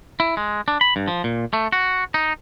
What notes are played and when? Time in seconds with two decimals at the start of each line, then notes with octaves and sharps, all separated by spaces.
0.20 E4
0.37 G#3
0.68 D4
0.81 B5
0.96 G2
1.08 F3
1.24 A#2
1.53 A3
1.72 F#4
2.14 D#4